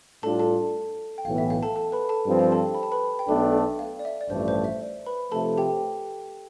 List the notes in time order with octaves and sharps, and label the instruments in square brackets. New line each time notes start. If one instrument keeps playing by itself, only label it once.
[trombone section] A2 G3 D4 F4 [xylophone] A4 A5
[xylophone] A4 A5
G5
[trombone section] B1 A2 E3 B3 [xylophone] F5
[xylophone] E5
F5
A4 A5
A4 A5
B4 B5
A4 A5
[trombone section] G2 F3 C4
[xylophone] G4 G5
A4 A5
B5
A5
B4 B5
G5
[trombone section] B1 B2 A3 D4 [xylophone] A4 A5
[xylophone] F5
D5
E5
D5
[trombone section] A1 G2 F3 A3 D4 [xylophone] C5
[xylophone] C5
E5
D5
B4 B5
[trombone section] C3 F3 A3 [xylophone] A4 A5
[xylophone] G4 G5